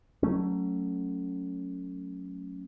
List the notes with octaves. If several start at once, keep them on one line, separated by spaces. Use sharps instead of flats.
F#3 A3 C#4